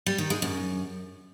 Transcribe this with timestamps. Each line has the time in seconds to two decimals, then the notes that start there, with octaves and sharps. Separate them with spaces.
0.06 G3
0.18 D#3
0.30 G#3
0.42 F#2